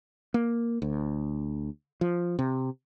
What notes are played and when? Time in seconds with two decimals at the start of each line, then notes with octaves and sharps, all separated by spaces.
0.34 A#3
0.82 D2
2.01 F3
2.39 C3